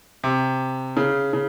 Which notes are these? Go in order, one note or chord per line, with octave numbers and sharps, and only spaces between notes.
C3
C#3
C#3